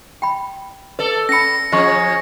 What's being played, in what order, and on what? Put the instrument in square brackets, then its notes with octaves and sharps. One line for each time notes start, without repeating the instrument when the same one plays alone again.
[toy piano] G5 B5
[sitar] A4 D5 [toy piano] B4
[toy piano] C#4 B5 [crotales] A#6 C#7
[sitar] F3 C#4 G#4 [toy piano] D#5 C#6